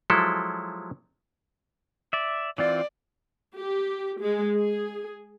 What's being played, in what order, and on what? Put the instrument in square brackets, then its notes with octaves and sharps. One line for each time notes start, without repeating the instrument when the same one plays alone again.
[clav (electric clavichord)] F3 F#3 G#3 E4 A4
[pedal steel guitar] D5 E5
[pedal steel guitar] E3 C4 F4 [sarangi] D5
[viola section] G4
G#3
G#4